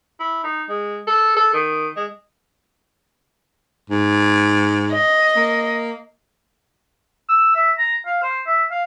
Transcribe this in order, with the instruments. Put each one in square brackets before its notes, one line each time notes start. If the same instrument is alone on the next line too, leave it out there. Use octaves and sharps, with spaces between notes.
[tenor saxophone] E4
D#4
G#3
A4
A4
D#3
G#3
[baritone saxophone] G#2
[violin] D#5
[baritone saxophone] A#3
[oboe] E6
E5
A#5
F5
C5
E5
F5